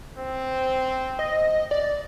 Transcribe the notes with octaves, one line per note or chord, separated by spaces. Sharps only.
C4
D#5
D5